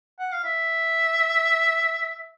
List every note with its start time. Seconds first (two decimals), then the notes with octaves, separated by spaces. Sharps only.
0.19 F#5
0.32 F5
0.44 E5